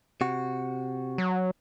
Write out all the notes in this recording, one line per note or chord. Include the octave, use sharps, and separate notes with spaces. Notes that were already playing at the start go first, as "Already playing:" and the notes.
C3 F#4
F#3